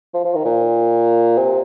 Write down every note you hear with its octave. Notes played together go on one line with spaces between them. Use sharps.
F3
F3
D#3
A#2
C3